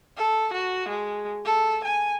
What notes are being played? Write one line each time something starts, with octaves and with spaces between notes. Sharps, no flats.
A4
F#4
G#3
A4
G#5